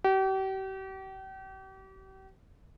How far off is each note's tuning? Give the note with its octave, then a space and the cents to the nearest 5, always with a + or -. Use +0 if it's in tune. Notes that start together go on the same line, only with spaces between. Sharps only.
G4 -40